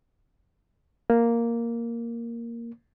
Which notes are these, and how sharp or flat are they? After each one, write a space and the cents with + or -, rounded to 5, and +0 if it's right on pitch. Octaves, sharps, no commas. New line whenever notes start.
A#3 +0